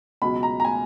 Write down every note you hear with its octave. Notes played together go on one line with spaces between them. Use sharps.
C#2 B2 F#3 B5
A#5
A#5
G#5